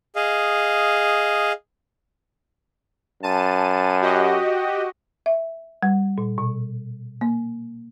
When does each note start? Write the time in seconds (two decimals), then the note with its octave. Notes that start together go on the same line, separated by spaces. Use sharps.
0.16 G#4 D#5 F5
3.23 F#2 A5 D#7
4.02 F#4 G4 D#5
5.26 E5
5.83 G3
6.18 A#2
6.38 B2
7.21 A#3